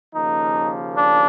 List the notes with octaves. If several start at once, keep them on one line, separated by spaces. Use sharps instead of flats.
D#2 C#3 F3 A#3 D#4
D4